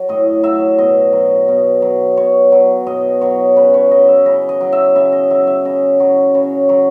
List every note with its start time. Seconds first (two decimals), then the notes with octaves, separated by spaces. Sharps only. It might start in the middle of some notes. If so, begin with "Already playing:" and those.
Already playing: F#3
0.09 A2 D#5
0.43 F#3 E5
0.78 B2 D#5
1.13 F#3
1.48 B2
1.82 F#3
2.17 B2 C#5
2.52 F#3
2.87 B2 D#5
3.21 F#3 C#5
3.56 C#3 B4
3.74 C#5
3.91 F#3 D#5
4.08 E5
4.26 C#3 D#5
4.49 D#5
4.61 F#3
4.73 E5
4.95 C#3 E5
5.12 D#5
5.30 F#3 E5
5.47 E5
5.65 C#3 D#5
6.00 F#3 C#5
6.34 C#3 C#5
6.69 F#3 C#5